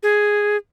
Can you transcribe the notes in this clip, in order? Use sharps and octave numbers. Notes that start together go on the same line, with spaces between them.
G#4